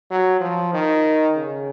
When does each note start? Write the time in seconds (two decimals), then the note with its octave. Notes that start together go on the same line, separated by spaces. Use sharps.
0.11 F#3
0.41 F3
0.73 D#3
1.36 C#3